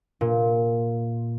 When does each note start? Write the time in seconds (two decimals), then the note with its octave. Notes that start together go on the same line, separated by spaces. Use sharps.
0.21 A#2